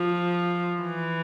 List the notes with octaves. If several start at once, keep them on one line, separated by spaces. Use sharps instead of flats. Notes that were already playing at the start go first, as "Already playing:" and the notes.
Already playing: F3
E3